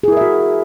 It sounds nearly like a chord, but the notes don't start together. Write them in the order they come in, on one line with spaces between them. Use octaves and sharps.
G#4 E4 A#4 E5 F#4